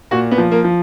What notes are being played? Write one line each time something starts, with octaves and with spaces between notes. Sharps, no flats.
A#2 F#4
B3
F3
A#3
F3